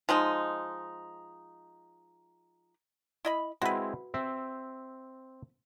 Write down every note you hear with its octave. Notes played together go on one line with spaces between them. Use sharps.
F3 G#3 D#4
E4 D#5 B5
G#3 C4 E4 F#4 B4
C4 E5